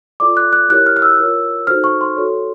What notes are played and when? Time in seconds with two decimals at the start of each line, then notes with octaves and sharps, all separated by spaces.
0.20 F4 A4 D5 D6
0.37 F#6
0.53 F#6
0.69 E4 G4 A#4 C#5 F#6
0.86 F6
0.96 F6
1.02 E6
1.19 F4 A#4 C#5
1.67 D#4 F#4 A4 C5 F6
1.84 C#6
2.01 C6
2.16 F#4 A4 C#5